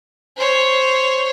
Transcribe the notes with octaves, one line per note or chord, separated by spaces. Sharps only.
C5 C#5